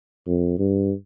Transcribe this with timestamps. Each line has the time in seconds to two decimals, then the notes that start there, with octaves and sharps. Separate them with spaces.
0.27 F2
0.58 G2